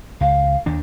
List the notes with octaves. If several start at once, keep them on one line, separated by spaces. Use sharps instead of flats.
C#2 F5
D#2 D#3 D4